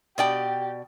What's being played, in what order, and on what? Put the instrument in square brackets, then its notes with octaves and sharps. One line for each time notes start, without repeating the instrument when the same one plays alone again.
[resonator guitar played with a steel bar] B2 D5 G5 [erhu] G4